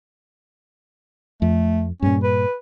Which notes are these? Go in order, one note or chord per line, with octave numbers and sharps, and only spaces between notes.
F2 A3
G2 A#2 C#4
B4